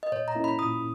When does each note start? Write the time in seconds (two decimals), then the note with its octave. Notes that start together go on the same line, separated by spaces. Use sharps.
0.03 D#5
0.12 A#2 C#5
0.28 A#5
0.35 A#3 C#4 E4
0.44 B5
0.59 A#2 D#6